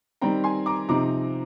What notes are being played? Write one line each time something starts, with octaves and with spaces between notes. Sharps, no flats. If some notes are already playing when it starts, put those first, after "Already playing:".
D#3 G3 C4 G5 A#5
G#5 C6
A#5 D6
C3 F3 C4 D#4 A#5 D6